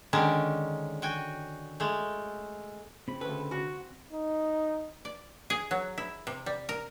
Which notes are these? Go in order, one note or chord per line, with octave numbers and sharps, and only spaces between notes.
D3 D#3 G#3 C#4
F#4 G5 G#5
G#3 A3
C#3 C4 B5
D2 A4 B4
F#4
D#4
D5
G#4
F#3
E4
C3
G3
A#4